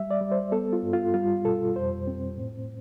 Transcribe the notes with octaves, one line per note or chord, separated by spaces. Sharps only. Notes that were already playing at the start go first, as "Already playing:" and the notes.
Already playing: G3 E5
D5
G3
C5
B3 A4
F4
G2
F4
G3 F4
B2 A4
F2 C5
C4
A2